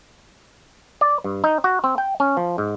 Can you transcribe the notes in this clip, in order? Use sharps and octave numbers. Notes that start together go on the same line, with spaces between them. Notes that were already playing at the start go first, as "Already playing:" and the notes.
D5
G2
D#4
F#4
C4
G5
C#4
F3
G#2